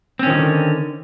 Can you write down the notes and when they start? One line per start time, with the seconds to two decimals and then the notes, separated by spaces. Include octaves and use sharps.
0.19 C4
0.23 C#4
0.26 D#3
0.30 F3
0.33 D3